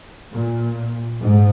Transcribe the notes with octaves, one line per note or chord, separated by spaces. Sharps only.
A#2
G#2